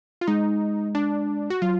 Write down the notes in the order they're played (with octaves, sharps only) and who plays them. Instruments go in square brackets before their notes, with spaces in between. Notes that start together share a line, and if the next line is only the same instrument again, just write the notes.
[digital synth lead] F4
[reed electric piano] G#3 [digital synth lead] D#4
[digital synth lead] D4
F#4
[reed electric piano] F#3 [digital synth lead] F4